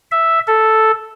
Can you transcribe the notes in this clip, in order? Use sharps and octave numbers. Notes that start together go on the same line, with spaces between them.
E5
A4